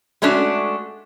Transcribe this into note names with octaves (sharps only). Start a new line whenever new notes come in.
G#3 A3 C#4 D4 F#4